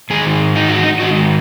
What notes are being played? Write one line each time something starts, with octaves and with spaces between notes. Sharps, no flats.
G#2 D#3 G#3 G#4
D#4
F#4
D#4
G#2 D#3 G#3 F#4